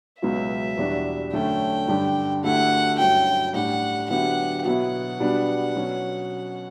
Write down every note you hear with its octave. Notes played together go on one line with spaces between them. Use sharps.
C#2 B2 F#3 B3 F#4 E5
E2 B2 G3 D4 F#4
F#2 D3 A3 C#4 G5
G2 D3 G3 D4 G4
D2 D3 A3 E4 G4 F#5
G2 F#3 C#4 E4 G5
A2 G3 D4 G4 F#5
D3 F#3 B3 E4 G4 F#5
B2 F#3 B3 E4 F#5
B2 G3 B3 D4
B2 F#3 C#4